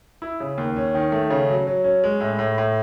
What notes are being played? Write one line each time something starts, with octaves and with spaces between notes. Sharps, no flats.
E4
C#3
D#2
C#4
D#3
A3
C#3
F#3
F#3
C#4
G#3
A2
A2
A2